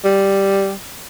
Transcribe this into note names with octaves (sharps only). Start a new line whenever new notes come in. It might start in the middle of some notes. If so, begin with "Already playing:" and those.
G3